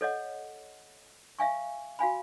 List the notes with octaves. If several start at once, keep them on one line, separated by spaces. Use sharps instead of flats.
A4 C#5 D#5 F#5
E5 F5 G#5 C#6
F#4 F5 G#5 B5